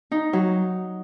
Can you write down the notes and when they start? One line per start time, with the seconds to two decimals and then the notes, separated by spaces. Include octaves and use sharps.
0.11 D#4
0.33 F#3